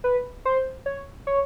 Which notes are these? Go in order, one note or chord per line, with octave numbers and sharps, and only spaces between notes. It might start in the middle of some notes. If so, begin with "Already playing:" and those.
B4
C5
C#5
C#5